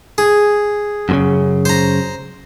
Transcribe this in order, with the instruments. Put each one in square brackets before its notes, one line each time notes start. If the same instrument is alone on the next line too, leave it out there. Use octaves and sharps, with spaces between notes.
[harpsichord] G#4
[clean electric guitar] F#2 A#2 C#3
[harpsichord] C5 A#5